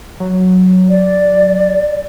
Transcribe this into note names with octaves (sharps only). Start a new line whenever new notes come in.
F#3
D5